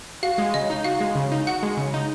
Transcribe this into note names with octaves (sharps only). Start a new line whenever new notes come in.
F#4 F5
G#3
C#3 D#5
D#4
F#4 F5
G#3
C#3
D#4
F#4 F#5
G#3
C#3
D#4